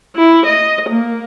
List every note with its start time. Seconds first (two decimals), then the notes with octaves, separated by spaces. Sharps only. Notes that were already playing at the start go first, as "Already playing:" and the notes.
0.16 E4
0.46 D#5
0.89 A#3